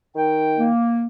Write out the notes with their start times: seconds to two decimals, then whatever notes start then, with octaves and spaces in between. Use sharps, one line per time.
0.16 D#3 G5
0.58 A#3